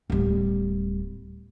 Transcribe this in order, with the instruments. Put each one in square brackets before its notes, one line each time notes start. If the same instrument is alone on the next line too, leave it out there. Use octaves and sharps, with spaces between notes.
[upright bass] D1 G3